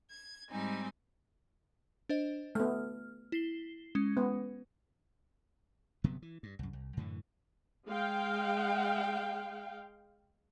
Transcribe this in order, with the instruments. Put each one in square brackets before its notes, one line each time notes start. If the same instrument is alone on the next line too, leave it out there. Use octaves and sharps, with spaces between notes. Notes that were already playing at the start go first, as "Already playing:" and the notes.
[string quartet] G#6
G#2 G3 C4 D#4 G#5
[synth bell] D4 C5 D#5
[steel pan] A3 B3 [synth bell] F6
[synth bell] E4 C7 G7
G#3 C#4
[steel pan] B3
[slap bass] G1 C3 F#3 B3
E3
G2
C2 F#2
C2
F#2 A2 D3 E3
[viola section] G#3 F5 G5